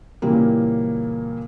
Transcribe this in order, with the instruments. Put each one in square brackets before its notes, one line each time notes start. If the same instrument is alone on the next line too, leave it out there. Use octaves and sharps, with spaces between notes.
[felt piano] A#2 C#3 E3 G3 A#3